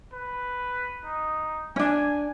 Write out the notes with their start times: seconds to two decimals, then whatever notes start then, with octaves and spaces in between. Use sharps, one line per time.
0.13 B4
1.04 D#4
1.76 C#4 D4 G#5